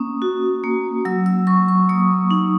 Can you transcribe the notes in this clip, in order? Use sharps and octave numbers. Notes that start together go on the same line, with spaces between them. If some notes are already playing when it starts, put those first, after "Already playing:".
Already playing: A#3 C#4 D#6
F#4
A#3
F#3 E6
E6
F#3 C#6
C#6
A#3 D#6
D#4